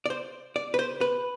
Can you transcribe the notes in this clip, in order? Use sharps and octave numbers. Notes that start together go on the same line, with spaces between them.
D5
C5
D5
B4
C5
B4